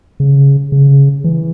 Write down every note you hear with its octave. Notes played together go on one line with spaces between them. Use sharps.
C#3
C#3
E3